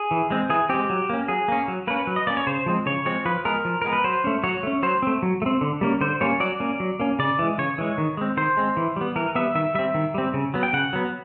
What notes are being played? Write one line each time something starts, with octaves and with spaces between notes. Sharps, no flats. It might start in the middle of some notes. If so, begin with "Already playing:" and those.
Already playing: G#4
E3
G#3 C4
E3 G#4
G#3 C4 G4
F#3
A#3 C#4
F#3 G#4
A#3 C#4
F#3
A#3 C#4 B4
F#3
D#5
A#3 C#4 D5
C#5
C#3 C5
F3 G#3 C4
C#3 C#5
F3 G#3 C4 C#5
F3 B4
G#3 B3 A#4
F3
G#3 B3 A#4
B4
F#3 C5
A3 C#4
F#3 C#5
A3 C#4
F#3 C5
A3 C4
F#3
A3
C4
D3
G3 A#3 C#4
D3 C5
G3 A#3 C#4 C#5
F#3 D5
A#3 C#4
F#3
A#3 C#4
C#3 D5
E3 G#3
C#3 C#5
E3 G#3
D#3
G#3 C4
D#3 C5
G#3 C4
E3
G3 B3
E3 A#4
G3 B3 E5
D#3 E5
G3 C4 E5
D#3
G3 C4
C#3
F#3 B3
G5
C#3 F#5
F#3 B3